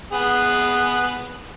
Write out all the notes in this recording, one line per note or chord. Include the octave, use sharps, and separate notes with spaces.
B3 G#4